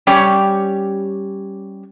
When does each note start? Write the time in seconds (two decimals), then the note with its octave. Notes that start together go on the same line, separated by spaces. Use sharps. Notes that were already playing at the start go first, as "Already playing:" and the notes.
0.07 G3 C#4 G4 C#5 D5